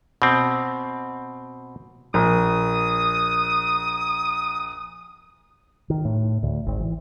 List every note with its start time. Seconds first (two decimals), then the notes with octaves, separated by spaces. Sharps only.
0.22 B2 C4
2.14 A#1 D#6
5.90 D#3
6.05 A2
6.43 D2
6.66 G#1
6.80 E3